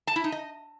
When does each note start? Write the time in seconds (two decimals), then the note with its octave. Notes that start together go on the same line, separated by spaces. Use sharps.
0.07 A5
0.16 E4
0.24 D#4
0.32 D#5